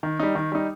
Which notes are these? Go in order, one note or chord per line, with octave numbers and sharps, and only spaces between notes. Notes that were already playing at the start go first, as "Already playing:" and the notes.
D#3
G3 D#4
D#3
G3 D#4